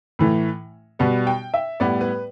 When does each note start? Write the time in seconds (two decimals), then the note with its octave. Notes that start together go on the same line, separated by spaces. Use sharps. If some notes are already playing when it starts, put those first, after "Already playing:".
0.19 A2 E3 A3
0.99 B2 G3 B3
1.27 G5
1.54 E5
1.80 A2 G3 B3 D5
2.01 B4